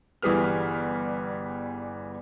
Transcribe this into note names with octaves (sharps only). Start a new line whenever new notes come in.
G1 E3 G3 G#4 B4 F6